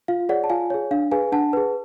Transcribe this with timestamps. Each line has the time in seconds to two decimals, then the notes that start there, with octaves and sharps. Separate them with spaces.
0.08 F4 F5
0.29 G#4 C#5 D5 F#5
0.44 A5
0.50 F4 F5 G#5
0.70 G#4 C#5
0.91 D4 F5
1.11 G#4 B4 F5 G#5
1.32 D4 F#5 A5
1.53 G#4 B4